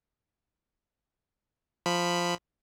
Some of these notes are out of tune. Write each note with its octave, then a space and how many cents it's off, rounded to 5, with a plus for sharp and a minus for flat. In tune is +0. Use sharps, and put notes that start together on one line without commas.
F3 +0 B5 +0